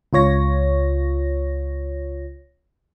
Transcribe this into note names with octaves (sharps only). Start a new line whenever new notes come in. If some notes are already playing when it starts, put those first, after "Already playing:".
C#2 F4 C#5 A#6